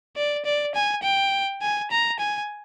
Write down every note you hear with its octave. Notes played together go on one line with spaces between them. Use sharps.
D5
D5
G#5
G5
G#5
A#5
G#5